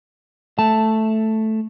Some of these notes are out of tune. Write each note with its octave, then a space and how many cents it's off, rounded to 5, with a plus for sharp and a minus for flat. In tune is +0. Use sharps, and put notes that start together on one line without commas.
A3 +0 A5 +0